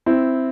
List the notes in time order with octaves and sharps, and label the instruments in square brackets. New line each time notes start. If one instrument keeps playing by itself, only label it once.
[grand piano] C4 E4